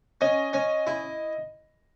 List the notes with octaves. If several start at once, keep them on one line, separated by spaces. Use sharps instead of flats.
C#4 D#5
C#4
E4